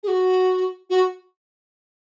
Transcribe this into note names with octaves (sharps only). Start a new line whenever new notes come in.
G#4
F#4
F#4